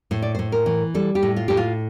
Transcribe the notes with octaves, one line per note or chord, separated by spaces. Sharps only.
A2 C5
D5
A2 C5
A#4
E3
G3 A4
G4
A2
F4
A2 G4
F4